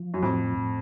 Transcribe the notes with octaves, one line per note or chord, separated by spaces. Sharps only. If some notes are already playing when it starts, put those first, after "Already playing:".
Already playing: F3
F#2
F2 A2
A2